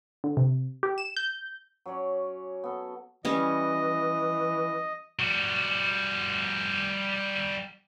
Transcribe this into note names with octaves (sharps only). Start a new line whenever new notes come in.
D3
C3
G4
E7
G6
F#3 C#4 C#5 D5
B3 A4
E3 G3 C#4 D#5
G3 F#4